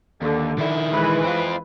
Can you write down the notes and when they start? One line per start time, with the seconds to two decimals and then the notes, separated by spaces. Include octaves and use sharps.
0.22 D#2 D3
0.58 D#3 E4
0.93 E3 G#3 B4
1.24 C4 F4